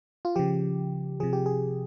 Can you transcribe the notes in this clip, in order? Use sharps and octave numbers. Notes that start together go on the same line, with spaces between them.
F4
C#3 F3 G4
C3 F3 G#4
G4
G#4